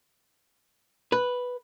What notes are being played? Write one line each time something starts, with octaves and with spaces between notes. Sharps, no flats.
B4